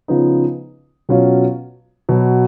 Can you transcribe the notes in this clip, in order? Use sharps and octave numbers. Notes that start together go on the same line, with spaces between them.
C#3 F3 B3 D#4
B2 F#3 C#4 F4
B2 F#3 B3